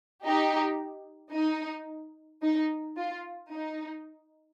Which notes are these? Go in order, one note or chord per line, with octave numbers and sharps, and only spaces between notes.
D#4 G4
D#4
D#4
F4
D#4